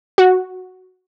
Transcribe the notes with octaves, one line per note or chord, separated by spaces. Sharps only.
F#4